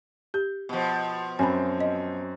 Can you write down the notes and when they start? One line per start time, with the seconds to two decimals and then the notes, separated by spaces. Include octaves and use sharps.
0.34 G4 G6
0.69 B2 F3
1.39 F#2 C4 G#5 A5 B5
1.80 D#5